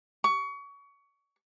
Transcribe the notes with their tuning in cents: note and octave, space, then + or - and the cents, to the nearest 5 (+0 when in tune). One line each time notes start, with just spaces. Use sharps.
C#6 +25